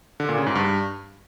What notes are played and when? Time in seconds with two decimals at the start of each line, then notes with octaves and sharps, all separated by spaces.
0.20 D3
0.29 A#2
0.38 C#3
0.46 G#2
0.55 G2